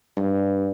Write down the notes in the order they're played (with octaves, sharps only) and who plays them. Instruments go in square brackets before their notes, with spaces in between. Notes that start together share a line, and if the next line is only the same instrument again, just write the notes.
[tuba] G2